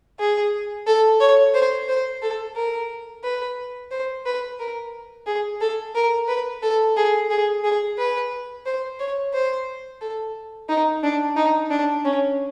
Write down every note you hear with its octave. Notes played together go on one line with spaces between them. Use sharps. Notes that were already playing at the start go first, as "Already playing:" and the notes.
G#4
A4
C#5
C5
C5
A4
A#4
B4
C5
B4
A#4
G#4
A4
A#4
B4
A4
G#4
G#4
G#4
B4
C5
C#5
C5
A4
D#4
D4
D#4
D4
C#4